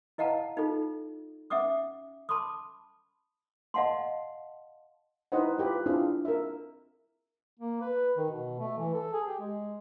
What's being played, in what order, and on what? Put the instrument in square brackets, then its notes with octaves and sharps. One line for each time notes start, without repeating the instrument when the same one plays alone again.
[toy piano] E4 D#5 F5 F#5 A5 A#5
D#4 F4 A4
C#4 E5 F#5 D6 D#6
A5 B5 C6 D6 D#6
D#5 F5 F#5 A5 C6
[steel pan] D#4 E4 B4 C5 D#5 F#5
F4 G4 B4
C4 D4 E4 F4 G#4
A#4 E5
[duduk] A#3
B4
D#3
B2
A3
E3
A4
G#4
G4
G#3